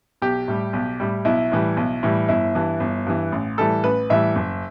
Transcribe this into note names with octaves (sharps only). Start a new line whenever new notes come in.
B1 G4
A2 G3
B1
A2 G3
B1 E4
A2 E3 G3
B1
A2 E3 G3
G1 E4
G2 E3
G1
G2 E3
A1
A2 E3 G3 A4
A1 B4
A2 E3 G3 E5
F#1